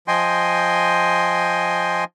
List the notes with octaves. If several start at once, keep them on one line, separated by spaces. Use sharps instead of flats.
F3 D#5 G5 G#5 C6